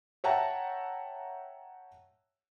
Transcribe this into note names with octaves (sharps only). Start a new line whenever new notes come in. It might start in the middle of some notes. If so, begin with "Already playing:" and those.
C#5 E5 F#5 G5 A5 A#5